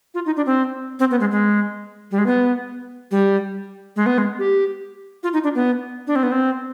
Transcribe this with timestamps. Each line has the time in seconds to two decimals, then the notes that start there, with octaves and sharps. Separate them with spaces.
0.14 F4
0.26 D#4
0.37 D4
0.46 C4
0.99 C4
1.11 B3
1.20 G#3
1.31 G#3
2.11 G3
2.18 G#3
2.26 B3
3.11 G3
3.96 G#3
4.06 B3
4.18 G#3
4.39 G4
5.23 F4
5.33 D#4
5.44 D4
5.55 B3
6.07 D4
6.16 C4
6.23 B3
6.32 C4